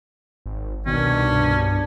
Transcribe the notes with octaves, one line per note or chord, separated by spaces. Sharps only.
G#1
C2 B2 D#3 C#4 D4
G2